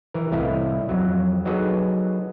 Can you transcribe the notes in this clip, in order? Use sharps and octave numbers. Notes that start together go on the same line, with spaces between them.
E3 A#4
C2 A2 A3 E4 D#5 F5
F2 F#3
F#3 D#4 F#4 G#4 A4 B4